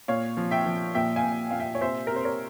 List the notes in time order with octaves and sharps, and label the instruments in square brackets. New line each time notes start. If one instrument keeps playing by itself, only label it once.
[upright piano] A#2 C#5 F5
F3
E5 G5
F3
A#2 E5 G5
F5 G#5
A#2
A#2 F5
E5 G5
C#5
C3 C5 E5
C3 A#4
C5
A#4 C#5